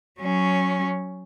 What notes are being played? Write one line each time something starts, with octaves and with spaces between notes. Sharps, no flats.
F#3 C#4